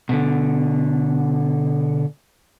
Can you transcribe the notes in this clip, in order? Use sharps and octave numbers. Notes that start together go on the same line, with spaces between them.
B2 D3